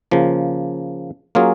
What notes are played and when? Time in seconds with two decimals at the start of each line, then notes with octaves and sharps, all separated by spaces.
0.11 C#3 F3 A#3
1.35 F#3 A#3 C#4 F4 G#4